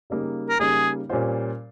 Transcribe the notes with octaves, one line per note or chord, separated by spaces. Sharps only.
C#3 G3 A#3 D#4
A#4
C#3 G3 A#3 D#4 G#4
A#2 G3 C#4 F4 C5